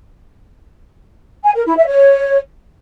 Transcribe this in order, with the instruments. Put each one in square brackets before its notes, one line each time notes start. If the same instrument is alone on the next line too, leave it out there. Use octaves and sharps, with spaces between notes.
[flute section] G#5
A#4
E4
E5
C#5